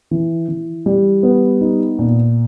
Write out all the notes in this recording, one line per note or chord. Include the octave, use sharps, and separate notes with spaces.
E3
E3
G3
B3
D#4
A#2